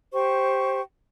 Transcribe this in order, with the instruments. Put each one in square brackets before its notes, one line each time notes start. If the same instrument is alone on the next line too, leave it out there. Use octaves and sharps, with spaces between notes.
[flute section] G4 C5 G5 C#6